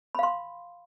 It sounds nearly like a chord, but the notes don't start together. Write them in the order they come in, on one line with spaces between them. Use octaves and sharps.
B5 F5 C6